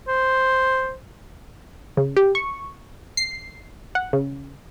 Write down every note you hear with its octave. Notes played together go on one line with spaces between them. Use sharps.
C5
C#3
G4
C#6
C7
F#5
C#3